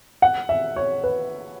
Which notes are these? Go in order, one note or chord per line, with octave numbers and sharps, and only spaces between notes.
F#5
E5
C#5
B4